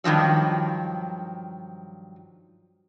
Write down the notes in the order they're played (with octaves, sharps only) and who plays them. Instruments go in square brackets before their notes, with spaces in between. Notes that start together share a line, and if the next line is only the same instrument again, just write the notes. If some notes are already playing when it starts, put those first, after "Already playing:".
[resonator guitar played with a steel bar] G2 D#3 F3 F#3